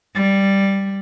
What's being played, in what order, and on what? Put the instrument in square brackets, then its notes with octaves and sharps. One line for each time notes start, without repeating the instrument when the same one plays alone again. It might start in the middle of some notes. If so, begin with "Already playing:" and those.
[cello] G3